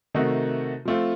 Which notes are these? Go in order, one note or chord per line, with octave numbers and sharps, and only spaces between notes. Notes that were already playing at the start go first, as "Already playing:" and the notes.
C3 D#3 A3 D#4 F#4
F3 A3 C4 F4